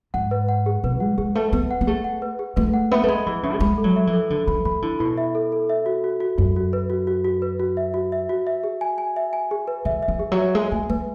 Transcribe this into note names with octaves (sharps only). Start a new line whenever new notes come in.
G#2 F#5
B4
F#5
G#4
B2 B4
G#3 F#5
G#3 G#4
A3 B4
B3 B4
F#5
B3
A3 G#4
F#5
B4
G#4
A3 B4
F#5
B3 E5
A3
G#3 B5
E3 B5
C#3 E5
A3
G#3 B5
A4
F#3
E5
E3
A4
D3 A4
E3 B5
E3 B5
D3 E4
B2 E4
E5
A4
A4
E5
F#4
F#4
F#4
F#2 F#4
F#4
B4
F#4
F#4
F#4
B4
F#4
E5
F#4
E5
F#4
E5
G#4
G#5
G#5
E5
G#5
G#4
B4
D3 E5
E5
E3
G#4
F#3
E5
G#3 E5
A3 G#5
A3 B4